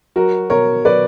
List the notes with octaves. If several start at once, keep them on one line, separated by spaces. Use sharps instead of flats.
F#3 F#4 A#4
B2 A#4 C#5
F#3 B4 D5